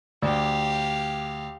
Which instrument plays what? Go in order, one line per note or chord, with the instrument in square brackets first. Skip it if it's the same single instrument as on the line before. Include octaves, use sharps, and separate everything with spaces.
[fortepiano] D2 D5 [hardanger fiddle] G4 F5